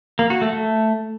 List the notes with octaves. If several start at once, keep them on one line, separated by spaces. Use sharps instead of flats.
A#3
F#4
A3
A3